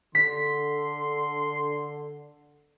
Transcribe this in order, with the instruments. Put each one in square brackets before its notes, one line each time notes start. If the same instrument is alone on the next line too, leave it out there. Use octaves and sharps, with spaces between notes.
[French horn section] D3 [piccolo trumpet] C6 [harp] B6